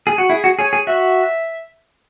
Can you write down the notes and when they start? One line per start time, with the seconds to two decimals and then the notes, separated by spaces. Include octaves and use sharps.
0.07 G#4
0.18 F#4
0.30 E4 G#4
0.44 F#4
0.59 G#4 C#5
0.73 G#4
0.87 F#4 E5